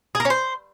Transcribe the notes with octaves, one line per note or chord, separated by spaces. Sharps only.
G#4
A#4
C#4
C5